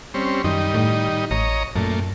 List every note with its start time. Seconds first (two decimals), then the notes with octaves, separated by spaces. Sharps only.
0.14 G3 C4 C#4
0.44 F#2 D#3 G3 D#4
0.74 A2
1.31 A1 C#5 D#5 A#5
1.76 F#2 A#2 A3